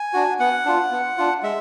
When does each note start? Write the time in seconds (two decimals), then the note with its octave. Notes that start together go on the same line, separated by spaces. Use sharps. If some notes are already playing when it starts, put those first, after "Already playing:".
Already playing: G#5
0.13 D4 F#4
0.39 B3 F#5
0.65 D4 F4
0.91 B3
1.18 D4 F4
1.43 G#3 E5